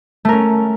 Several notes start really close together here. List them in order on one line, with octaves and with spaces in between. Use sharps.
A3 A#4 C#4